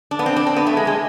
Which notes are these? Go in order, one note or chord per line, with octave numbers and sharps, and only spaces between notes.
D4
B3
C4
D4
C4
B3
A3
G#3
G#3